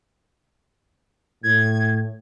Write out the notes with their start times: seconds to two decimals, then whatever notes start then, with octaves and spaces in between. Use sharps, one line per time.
1.44 A2 G#6